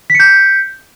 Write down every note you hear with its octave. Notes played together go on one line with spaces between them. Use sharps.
G6 B6 C#7